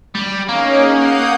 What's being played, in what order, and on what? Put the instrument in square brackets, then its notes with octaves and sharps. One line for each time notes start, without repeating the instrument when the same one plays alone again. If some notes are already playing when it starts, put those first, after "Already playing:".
[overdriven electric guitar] G3
[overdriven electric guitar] A#3 [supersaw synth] C#4 D#4 G#4
[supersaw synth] F#5 D#6 G6